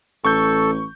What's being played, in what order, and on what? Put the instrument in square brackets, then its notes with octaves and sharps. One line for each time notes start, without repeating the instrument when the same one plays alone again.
[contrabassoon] A1 [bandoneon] A4 [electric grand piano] C#6 G6